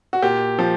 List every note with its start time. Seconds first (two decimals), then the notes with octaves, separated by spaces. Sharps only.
0.13 F#4
0.22 A#2 G4
0.59 F3